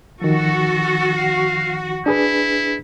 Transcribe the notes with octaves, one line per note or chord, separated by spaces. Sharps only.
D#3 F3 F#4 A4
F5
D4 E4 G#4 B4